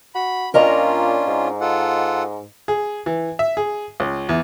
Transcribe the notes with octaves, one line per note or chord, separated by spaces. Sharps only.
F#4 B5
A#2 C#4 D4 F4 A#4 D#5 A#5
G#2
F4 A4 F#5
G#4
E3
E5
G#4
C#2
E2